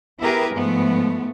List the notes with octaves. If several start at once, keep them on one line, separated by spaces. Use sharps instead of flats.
B3 E4 G4 G#4 A#4 B4
G#2 F3 A3 B3